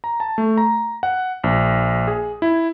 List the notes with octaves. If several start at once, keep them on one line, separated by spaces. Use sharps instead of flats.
A#5
A5
A3
A#5
F#5
A#1
G#4
E4